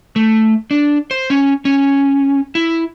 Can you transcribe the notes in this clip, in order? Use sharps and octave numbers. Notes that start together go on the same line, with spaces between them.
A3
D4
C5
C#4
C#4
E4